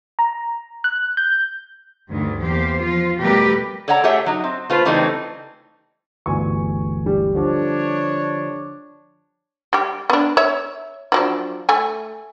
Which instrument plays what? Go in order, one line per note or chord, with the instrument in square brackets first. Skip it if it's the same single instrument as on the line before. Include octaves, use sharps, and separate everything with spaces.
[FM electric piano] A#5
F#6
G6
[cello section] D2 G2 D#3
E2 A#3 G4 C5
F3 F4
B2 G3 A3 G4 A#4 B4
[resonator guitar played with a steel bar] A4 C#5 D5 F#5 A#5
A3 G4 G#4 C#5 E5 F#5
F#3 D#4
C4
A3 F4 B4 C5
C#3 E3 G3 A3 C4 D#4
[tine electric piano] G1 D2 E3 [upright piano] G#5 C#6
[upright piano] G3
[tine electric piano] D3 F3 [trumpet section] D4 C#5
[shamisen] G3 G4
B3 D4
C#5 E5
F3 F#3 D4
A3 G#5